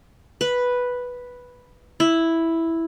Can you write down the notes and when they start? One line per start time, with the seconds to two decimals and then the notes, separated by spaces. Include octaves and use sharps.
0.41 B4
2.00 E4